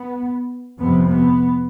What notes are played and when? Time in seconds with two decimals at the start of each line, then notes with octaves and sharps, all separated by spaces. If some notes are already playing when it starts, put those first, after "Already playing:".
Already playing: B3
0.79 F2 C3 B3
1.08 B3